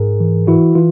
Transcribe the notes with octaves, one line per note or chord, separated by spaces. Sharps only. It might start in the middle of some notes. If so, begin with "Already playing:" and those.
Already playing: G#2 G#4 A#4
E3
E3 E4 F#4
E3 F4